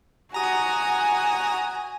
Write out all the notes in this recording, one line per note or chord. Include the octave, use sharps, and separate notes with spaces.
F#4 G#5 A#5 D#6